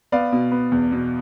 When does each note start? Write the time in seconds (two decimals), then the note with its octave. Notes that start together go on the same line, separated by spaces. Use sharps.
0.12 B3 D5 F5
0.32 B2
0.52 B3
0.72 E2
0.92 B2